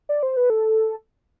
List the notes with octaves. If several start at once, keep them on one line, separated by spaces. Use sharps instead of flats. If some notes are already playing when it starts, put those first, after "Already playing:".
D5
C5
B4
A4